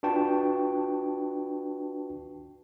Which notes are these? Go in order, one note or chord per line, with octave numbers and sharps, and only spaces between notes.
D4 F4 F#4 B4 G5 A5